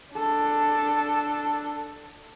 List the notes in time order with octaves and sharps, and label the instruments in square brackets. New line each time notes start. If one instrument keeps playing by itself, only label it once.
[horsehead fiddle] D4 A4